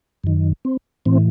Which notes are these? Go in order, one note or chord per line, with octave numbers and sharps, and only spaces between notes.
F#2 D#3
C4
A2 E3 C4